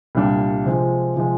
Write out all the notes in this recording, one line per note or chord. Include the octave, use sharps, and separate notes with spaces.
C2 A#2 G3 D4
C3 F3 G#3
C3 F3 G#3